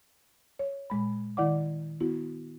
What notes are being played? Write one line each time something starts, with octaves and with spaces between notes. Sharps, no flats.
C#5
A#2 G#3 B5
D#3 E4 D5 F#5 D6
B3 E4 F#4